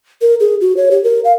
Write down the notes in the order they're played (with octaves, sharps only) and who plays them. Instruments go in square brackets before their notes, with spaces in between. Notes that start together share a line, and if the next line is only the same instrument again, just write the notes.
[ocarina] A#4
G#4
F#4
C#5
G4
A#4
F5